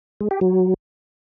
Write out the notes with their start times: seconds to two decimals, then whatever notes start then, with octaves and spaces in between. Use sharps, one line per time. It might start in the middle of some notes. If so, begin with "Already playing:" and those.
0.21 G#3
0.31 G4
0.41 F#3